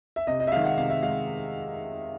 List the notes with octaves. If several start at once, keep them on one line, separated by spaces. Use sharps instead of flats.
E5
C3 D#5
D#5
E5
D#3 G#3 F5
F#5
C3 F5
E5
G#3 F5